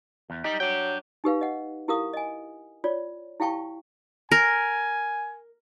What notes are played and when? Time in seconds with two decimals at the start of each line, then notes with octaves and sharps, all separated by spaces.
0.30 E2
0.44 G3 D#4 G4
0.60 F#3 D4 G5
1.24 D#4 G4 B4 F5
1.41 D#5 F#5
1.88 E4 G4 A#4 F5 D#6
2.14 D#5 G#5
2.84 F4 C#5 D5
3.40 E4 G4 F5 G5 A5 C#6
4.32 A#4 G#5